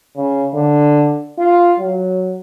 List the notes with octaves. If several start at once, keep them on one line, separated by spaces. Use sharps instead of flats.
C#3
D3
F4
F#3